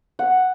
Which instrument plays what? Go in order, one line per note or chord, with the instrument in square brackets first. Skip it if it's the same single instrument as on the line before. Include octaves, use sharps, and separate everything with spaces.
[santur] F#5